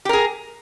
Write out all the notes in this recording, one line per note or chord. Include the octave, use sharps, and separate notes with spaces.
G4 G#4 A#4